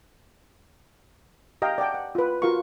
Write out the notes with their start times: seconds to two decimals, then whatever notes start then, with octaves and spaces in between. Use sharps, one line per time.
1.62 G4 D#5 F5 G5 A#5
1.78 D5 F#5 G5 A5
1.94 F#5
2.15 F4 B4
2.42 F4 F#4 A#4 F5 A#5 C#6